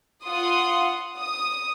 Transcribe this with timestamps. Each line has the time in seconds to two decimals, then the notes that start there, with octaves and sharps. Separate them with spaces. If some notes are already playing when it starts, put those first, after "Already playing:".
0.25 F4 F#5 C6 D#6
1.18 D#6